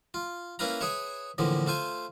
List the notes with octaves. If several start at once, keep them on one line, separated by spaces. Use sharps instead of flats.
F4
A#3 C#4 E4 B4 F5 A#5
G#4 B4 C#5 E5
A2 D3 E3 F3 A#3
A3 F4 C5 G#5